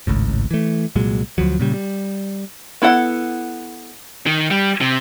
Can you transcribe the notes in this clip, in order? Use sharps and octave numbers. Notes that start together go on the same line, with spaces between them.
G#1 C#2 A2
E3 A3
C2 A#2 F#3 G#3
D2 F3 F#3
A#2 C#3 G3
G3
B3 E4 A4 F#5
D#3
G3
C3